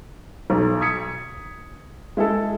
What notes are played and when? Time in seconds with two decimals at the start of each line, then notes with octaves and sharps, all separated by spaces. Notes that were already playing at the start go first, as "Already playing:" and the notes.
0.50 B1
0.81 D#6 G#6 B6 C#7
2.17 G#3 E4 G#4 A4